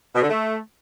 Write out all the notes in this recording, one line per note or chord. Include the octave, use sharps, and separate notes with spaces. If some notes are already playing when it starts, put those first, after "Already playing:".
B2
D3
A3